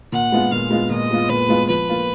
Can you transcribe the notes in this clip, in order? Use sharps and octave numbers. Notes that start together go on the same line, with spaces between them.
A#2 F#5
G#3 B3 F4
A#2 F5
G#3 B3 F4
A#2 D#5
G#3 B3 F4
A#2 B4
G#3 B3 F4
F3 B4
A#3 F4